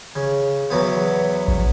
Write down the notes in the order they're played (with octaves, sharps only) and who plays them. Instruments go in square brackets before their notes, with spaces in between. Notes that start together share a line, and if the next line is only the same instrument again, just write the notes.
[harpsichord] C#3
E2 F#3 B3
[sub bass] A#1